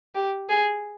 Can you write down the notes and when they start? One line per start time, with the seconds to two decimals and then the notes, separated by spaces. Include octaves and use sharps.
0.15 G4
0.49 G#4